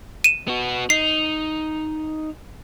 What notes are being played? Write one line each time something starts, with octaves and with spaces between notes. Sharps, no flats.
D#7 E7
B3 F#4
D#4 C7